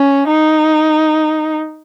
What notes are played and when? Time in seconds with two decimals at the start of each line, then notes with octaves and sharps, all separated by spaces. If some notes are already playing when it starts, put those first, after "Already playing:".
Already playing: C#4
0.28 D#4